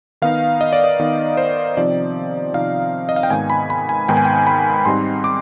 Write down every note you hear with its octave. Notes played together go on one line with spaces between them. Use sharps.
D#3 B3 D#4 F5
D#5
D5
D#5
D#3 B3 D#4
C5
C3 F3 C4 D#4 D5
C3 F3 C4 D#4 F5
D#5
F5
G5
G#2 D#3 B3 D#4 G#5
B5
B5
G#5
G#2 D#3 B3 D#4 G5
G#5
G5
B5
G#2 G3 C4 D#4 C6
D6